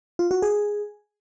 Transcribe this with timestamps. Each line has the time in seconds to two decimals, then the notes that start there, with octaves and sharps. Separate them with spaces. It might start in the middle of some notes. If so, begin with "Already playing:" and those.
0.19 F4
0.31 F#4
0.42 G#4